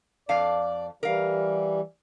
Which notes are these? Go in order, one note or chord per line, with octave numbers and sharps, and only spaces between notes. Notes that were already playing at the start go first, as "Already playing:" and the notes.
F2 D5 F5
E3 G3 A#4 F5